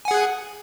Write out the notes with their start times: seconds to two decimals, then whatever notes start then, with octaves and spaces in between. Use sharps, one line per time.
0.05 G#5
0.08 F#5
0.11 G#4